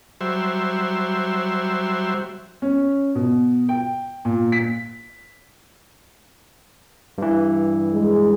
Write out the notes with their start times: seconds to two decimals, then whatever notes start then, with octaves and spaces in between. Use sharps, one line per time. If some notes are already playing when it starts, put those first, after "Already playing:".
0.21 F#3 G3 C5 E5
2.62 C#4
3.15 B2
3.69 G5
4.25 A#2
4.52 B6
7.18 G2 E3
7.93 G#3